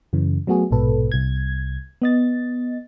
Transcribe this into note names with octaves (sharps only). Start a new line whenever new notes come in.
F#2 C#3 E3
F#3 A3 B3 F#4 G#4
A#1 G#2 B2 A4 B4
C2 G#6
B3 D#5 A6